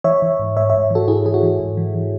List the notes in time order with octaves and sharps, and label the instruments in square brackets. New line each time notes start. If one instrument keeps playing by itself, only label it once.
[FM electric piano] E3 C#5 E5
E3
G#2
G#2 C#5 E5
G#2 C#5 E5
E3 F#4 A4
G#2 E4 G#4
E3 G#4
F#4
E3
G#2
E3
E3